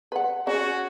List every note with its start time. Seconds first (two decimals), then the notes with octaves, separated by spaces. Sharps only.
0.12 B4 F#5
0.47 C#4 F#4 G#4